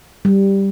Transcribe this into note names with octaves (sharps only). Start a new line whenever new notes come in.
G3